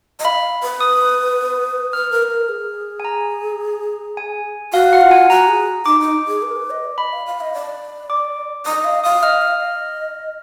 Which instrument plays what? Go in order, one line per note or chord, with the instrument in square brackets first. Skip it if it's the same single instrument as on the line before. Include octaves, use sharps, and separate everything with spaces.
[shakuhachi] D#5
[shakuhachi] F5 [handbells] B5
[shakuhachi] B4
[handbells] D#6
[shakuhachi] B4 [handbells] F6
[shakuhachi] A#4
B4
A#4
G#4
[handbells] G#5
A#5
G#5
[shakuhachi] F#4 [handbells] F5
[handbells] F#5
[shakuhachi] F4
[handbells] G#5
[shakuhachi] F#4 [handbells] A#5
[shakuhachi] G#4
[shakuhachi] D#4 [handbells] D6
[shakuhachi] D#4
G#4
B4
A#4
B4
D#5
D5
[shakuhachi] D#5 [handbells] B5
[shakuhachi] F5
F5
D#5
D5
[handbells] D6
[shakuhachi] D#5 [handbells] D#6
[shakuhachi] F5
[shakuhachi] F5 [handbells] D#6
[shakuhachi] D#5 [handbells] F6
[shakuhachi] F5
D#5